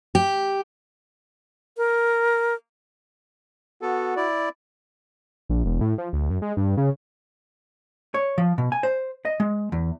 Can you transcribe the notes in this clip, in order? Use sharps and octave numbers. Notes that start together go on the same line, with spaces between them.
G4
A#4
B3 F#4 A4
E4 D5
A#1
E1
A2
F3
D2
F#2
G#3
G2
C#3
C#5
F3
B2
G#5
C5
D#5
G#3
E2